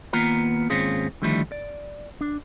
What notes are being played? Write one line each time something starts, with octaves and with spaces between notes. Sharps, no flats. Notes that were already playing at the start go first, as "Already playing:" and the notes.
D#2 A#3 B3 F4 B4 A#5
D#2 G#2 C4 C#4 F4 G#4
D3 D#3 F3 G3 A3 E4
D5
D4